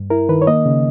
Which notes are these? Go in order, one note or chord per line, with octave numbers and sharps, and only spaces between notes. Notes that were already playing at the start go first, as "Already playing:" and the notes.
Already playing: G2
E4 A#4
D#3 B4
C#5
A#3 D#5
C#3